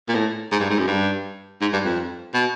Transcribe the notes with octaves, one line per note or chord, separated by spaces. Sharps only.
A#2
A2
G#2
G2
G#2
F#2
G2
G#2
G2
F2
B2